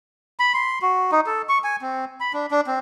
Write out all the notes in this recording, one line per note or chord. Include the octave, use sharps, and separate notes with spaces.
B5
C6
F#4
D#4
A4
C#6
G#5
C4
B5
D4
D4
C4